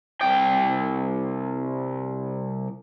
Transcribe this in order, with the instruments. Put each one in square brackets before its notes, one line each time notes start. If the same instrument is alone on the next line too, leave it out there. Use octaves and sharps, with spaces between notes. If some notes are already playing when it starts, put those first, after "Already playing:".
[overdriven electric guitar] C2 G5